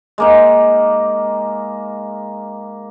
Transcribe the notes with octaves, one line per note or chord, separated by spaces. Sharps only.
G#3 A#3 D#4